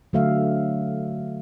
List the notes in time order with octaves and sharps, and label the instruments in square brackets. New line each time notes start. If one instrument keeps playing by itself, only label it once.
[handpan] D3 F#3 A3 E5 F5